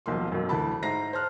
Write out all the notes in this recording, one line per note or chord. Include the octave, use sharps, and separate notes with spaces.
D#1 B1 F3 A#3 C6
B1 F#2
D2 E3 F#5 A5 B5
G#2 C5 E5 A#5 A#6 C7
C5 A5 F6 F#6